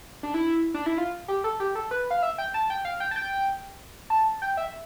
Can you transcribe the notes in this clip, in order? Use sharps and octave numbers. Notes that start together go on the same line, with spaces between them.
D4
E4
D4
E4
F4
G4
A4
G4
A4
B4
F5
E5
G5
A5
G5
F5
G5
A5
G5
A5
G5
E5